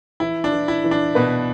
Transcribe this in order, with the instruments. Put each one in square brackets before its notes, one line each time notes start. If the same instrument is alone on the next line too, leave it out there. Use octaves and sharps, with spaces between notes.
[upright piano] E3 [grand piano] E4
[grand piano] D4
[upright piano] E3
[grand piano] E4
[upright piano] E3
[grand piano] D4
[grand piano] B2 [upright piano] B4